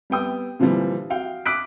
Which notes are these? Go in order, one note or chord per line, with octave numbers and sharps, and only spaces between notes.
G3 B3 G5 D#6
A#2 D3 E3 F3 G3
F#4 F5 G5
D6 D#6 F#6 B6 D7